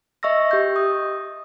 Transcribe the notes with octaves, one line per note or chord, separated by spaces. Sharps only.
D#5 E5 C#6 E6 A#6
G4 G6
D#6